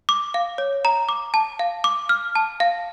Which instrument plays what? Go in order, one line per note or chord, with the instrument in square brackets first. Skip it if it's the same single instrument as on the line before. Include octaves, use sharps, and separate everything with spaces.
[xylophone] D6
F5
C#5
A#5
D6
A5
F5
D6
F6
A5
F5